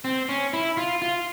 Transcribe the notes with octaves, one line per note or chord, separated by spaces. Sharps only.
C4
C#4
E4
F4
F4